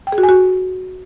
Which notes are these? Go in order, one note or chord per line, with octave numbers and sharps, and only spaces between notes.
G5
G#4
F#4
G#5
F#4